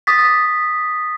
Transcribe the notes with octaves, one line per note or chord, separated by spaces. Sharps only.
D6 D#6 A6 B6